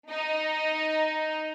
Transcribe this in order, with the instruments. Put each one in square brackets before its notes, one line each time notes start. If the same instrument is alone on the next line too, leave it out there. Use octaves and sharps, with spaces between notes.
[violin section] D#4